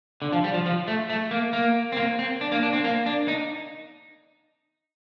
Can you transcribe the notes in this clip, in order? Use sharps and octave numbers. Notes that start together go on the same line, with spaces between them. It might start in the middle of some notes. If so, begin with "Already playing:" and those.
D3
F3
G3
F3
F3
A3
A3
A#3
A#3
C4
A#3
C4
D4
A#3
D4
C4
A#3
D4
D#4